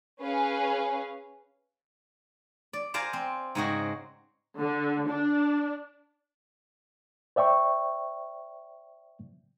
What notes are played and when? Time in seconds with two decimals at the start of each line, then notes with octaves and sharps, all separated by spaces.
0.21 C#4 G#4 B4 C#5 F5
2.73 D5
2.94 C5 D5 F5 G#5 A#5
3.13 C4
3.55 G#2 C#3 G#3 C4 F#4 G#4
4.60 D3
5.09 D4
7.36 C5 D5 E5 G5 C#6